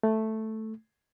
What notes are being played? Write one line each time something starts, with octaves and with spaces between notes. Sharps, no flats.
A3